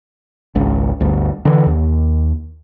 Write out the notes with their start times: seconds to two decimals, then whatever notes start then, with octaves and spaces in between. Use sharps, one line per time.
0.55 G#1 C#2
1.01 G1 D2
1.45 D3 E3
1.66 D#2